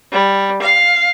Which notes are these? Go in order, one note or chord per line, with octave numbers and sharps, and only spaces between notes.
G3
F5